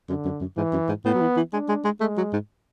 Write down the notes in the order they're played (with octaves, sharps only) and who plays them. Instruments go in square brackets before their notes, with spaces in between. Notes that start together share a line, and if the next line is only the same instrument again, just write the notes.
[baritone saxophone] F#2 [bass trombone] D3
[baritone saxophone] F#2
F#2
[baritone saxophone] G#2 [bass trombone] E3
[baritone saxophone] F#2
G#2
[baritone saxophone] A2 [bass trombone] B3
[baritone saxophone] F#3
E3
E3
[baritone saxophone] G#3 [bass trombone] D4
[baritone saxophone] G#3
G#3
[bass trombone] G#3 [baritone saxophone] A3
[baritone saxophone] F#3
G#2